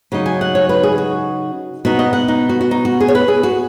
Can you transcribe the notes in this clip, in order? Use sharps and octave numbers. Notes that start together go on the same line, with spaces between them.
C#3 F#3 D#4
G#5
F#5
C#5
B4
G#4
F#4
B2 B3 D#4 F#4
D#5
F#5
D#4
F#4
F#4
D#4
F#4
G#4
C#5
B4
G#4
F#4